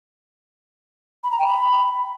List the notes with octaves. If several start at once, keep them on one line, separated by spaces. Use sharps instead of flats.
B5
A#5
G5
B5